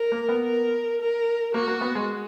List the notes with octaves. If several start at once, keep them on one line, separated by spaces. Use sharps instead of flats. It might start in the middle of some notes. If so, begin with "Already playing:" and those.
Already playing: A#4
A#3
B3
A#4
A#4
A#3 F#4
A#3
B3
G#3